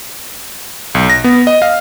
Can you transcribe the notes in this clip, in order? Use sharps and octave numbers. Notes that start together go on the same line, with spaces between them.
B1
A#6
B3
D#5
F5